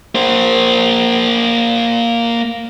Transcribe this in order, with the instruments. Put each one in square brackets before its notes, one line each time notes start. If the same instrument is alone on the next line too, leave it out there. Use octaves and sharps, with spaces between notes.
[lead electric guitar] A#3 C5